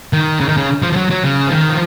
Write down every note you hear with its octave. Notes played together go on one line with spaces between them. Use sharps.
D#3
C#3
D#3
C#3
F3
F3
F#3
F#3
C#3
F3
D#3
F3